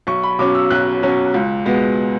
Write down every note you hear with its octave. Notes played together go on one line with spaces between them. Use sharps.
B1 C#6
B5
B2 F#3 C#4 D6
E6
B1 F#6
B2 F#3 C#4
C#2
B2 G#3 B3